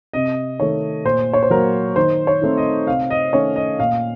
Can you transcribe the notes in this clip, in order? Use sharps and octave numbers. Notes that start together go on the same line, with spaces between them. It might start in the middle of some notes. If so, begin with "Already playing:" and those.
C3 D#5
D#3 A3 C#5
A#2 C5
C#5
C5
F#3 A#3 A#4
D#3 C5
C#5
A3 C4 D#4
D#5
C3 F5
D#5
D#3 A3 C#4 C#5
D#5
A#2 F5